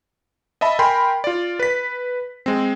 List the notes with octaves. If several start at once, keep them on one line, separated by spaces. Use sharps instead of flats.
D#5 E5 A5 B5
A#4 G5 G#5 B5 C6
F4 D5
B4 B6
G#3 C4